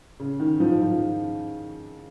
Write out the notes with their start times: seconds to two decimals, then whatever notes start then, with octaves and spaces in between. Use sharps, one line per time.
0.20 C#3
0.40 D#3
0.60 F3
0.80 F3